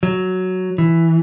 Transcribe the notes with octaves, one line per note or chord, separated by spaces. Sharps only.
F#3
E3